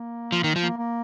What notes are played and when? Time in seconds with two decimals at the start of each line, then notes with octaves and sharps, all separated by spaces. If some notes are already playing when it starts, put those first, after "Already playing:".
Already playing: A#3
0.32 F3
0.44 D#3
0.56 F3
0.62 A#3
0.77 A#3